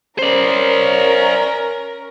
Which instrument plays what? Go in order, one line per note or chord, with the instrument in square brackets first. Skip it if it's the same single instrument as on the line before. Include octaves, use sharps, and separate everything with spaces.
[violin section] C#4 A#4 [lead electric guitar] C5 D5